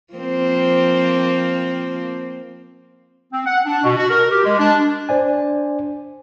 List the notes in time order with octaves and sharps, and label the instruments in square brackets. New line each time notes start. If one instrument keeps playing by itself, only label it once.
[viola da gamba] F3 A#3 C4
[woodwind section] C4
F#5
D4
B2
F#4
A#4
G4
G#3
D4
[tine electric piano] D4 C5 D5 G#5